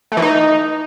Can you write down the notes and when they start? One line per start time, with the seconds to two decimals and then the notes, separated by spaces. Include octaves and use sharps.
0.12 A3
0.17 E3
0.22 D#4